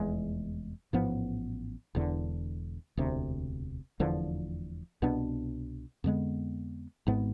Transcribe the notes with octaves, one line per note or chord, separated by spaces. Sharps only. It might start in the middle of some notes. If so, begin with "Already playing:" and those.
Already playing: F1 E2 G#3
A1 G#2 F3 B3
E1 E2 D3
E1 D2 C3
F1 E2 D3 F3
C2 B2 B3 D4
F2 D3 G#3 B3
G#1 G#2 G#3 B3